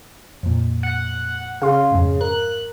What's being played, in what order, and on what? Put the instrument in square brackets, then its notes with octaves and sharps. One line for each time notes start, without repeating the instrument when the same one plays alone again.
[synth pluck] F2 A#2
[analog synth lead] F#5
[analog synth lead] C#3 [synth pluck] F5 C6
[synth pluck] F2 G#2
[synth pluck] A#4 [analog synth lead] F#6